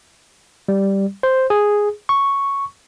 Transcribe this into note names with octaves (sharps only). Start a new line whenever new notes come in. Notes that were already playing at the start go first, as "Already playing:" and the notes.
G3
C5
G#4
C#6